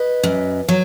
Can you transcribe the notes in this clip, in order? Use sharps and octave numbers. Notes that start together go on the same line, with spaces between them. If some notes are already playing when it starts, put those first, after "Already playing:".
Already playing: B4 D#5
F#2
F#3